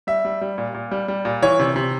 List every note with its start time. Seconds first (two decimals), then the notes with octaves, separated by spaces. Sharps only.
0.07 G3 E5
0.25 G3
0.41 G3
0.58 A#2
0.74 A#2
0.91 G3
1.08 G3
1.25 A#2
1.42 E3 C#5
1.59 C3
1.76 C3